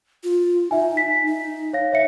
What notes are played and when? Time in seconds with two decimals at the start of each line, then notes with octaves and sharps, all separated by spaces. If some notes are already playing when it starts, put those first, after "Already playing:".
0.24 F4
0.71 D#4 E5 G#5
0.97 B6
1.26 D#4
1.73 C#5 F5 A#6
1.92 C#5 E5 C#7